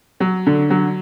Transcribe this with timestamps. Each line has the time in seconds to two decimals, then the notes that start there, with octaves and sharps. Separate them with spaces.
0.20 F#3
0.46 D3
0.70 F#3